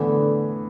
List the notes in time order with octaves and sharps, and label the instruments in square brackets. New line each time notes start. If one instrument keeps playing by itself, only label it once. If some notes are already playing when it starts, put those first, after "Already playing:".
Already playing: [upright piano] A2 E3 B3 [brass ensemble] D3